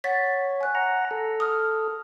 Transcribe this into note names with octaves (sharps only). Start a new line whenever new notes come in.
C#5 F#5 A6 B6
G#5 F#6
F#5 A#5
A4
D#6 F6